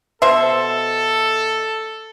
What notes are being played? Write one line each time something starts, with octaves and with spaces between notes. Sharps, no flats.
B2 A4 C5 E5